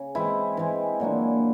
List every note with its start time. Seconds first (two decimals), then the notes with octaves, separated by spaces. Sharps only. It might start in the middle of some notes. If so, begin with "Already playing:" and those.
Already playing: C#3
0.15 E3 G#3 C4 E4
0.57 E3 G#3 C4
1.00 A#2 F#3 A#3 D4